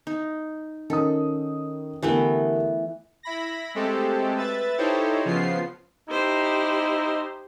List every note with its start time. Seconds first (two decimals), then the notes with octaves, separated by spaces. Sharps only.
0.07 D#4
0.90 D#3 C#4 A4 D#6
2.03 D3 E3 A3 B3 G4 A#4
3.23 E4 B5 A#6
3.75 G#3 A3 C4 G4 A4
4.36 B4 E5 A6
4.78 D#4 E4 G4 A4 C5 C#5
5.25 C#3 F3 B3 F4 C7
6.09 D#4 E4 G4 C5